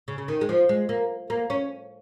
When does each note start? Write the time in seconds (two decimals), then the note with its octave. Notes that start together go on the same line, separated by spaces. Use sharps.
0.08 C#3
0.18 C#3
0.28 D#3
0.41 G#3
0.49 F3
0.69 G#3
0.89 A#3
1.30 A#3
1.50 C#4